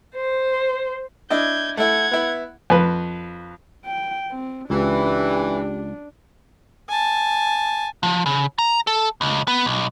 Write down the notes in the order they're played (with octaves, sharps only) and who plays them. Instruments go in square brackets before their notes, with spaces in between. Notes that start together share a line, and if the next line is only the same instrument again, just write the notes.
[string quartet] C5
[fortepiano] D4 E4 D#5 [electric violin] G6 G#6
[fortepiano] A3 E4 [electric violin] F#5 G#6
[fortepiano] B3 E4
F2 B4
[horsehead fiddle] G5
C4
[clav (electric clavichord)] C#2 [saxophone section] E3 [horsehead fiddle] D4 [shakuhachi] G4
[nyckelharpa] G#5 A5
[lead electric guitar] F3
C#3
A#5
A4
C#2
B3
B1